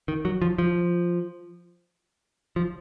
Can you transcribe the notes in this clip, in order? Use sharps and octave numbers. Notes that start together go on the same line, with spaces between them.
D#3
F#3
F3
F3
F3